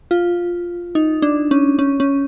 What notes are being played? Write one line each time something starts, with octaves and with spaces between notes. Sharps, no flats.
F4
D#4
D4
C#4
C#4
C#4